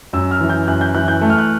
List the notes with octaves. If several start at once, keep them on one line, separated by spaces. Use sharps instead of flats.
F#2 E6
F6
E3
G6
F#2 F#6
G6
E3 F#6
G6
A3
F6
F#6